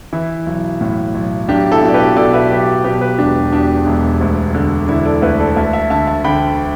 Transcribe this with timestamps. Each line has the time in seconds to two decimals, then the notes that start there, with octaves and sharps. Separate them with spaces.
0.13 E3 E4
0.46 B1
0.81 A2
1.15 B1
1.48 B1 D4 G4
1.71 E4 A4
1.82 B2
1.89 D5
1.94 G4 B4
2.16 B2 A4 D5
2.34 B4 E5
2.51 B1 G4 B4
2.84 B2 G4 B4
3.01 G4 B4
3.18 E1 D4 G4
3.52 E2 D4 G4
3.87 E1
4.21 D2
4.55 D3
4.88 D3 E4
5.05 A4 D5
5.22 D2 B4 E5
5.39 A4 D5
5.56 D2 E5 A5
5.73 E5 A5
5.90 D3 E5 A5
6.07 E5 A5
6.24 D3 G5 B5